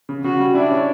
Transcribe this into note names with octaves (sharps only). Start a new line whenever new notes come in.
C#3
C#3 F#4
G3
D4 E4
C#4